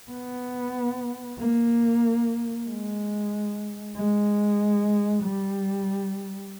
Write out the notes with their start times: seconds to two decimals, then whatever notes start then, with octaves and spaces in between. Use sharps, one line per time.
0.11 B3
1.40 A#3
2.67 G#3
3.96 G#3
5.24 G3